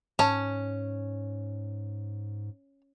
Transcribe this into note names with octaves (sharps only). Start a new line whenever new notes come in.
G#2 C#4 C#5 A5